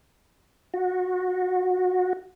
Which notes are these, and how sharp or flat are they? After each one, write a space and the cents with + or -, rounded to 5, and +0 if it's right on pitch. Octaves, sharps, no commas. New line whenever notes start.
F#4 -20